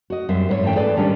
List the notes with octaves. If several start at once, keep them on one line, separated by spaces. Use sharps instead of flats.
F#4 D#5
F#2 G3 C4 E5
G#2 B4 C#5
G#2 E3 A3 C#4 G5
G#4 A4 B4 D5 G5 G#5
G#2 D#3 G3 C#4 D4 D5